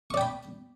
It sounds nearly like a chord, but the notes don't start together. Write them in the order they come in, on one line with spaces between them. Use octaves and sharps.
C#6 D5 G5 B5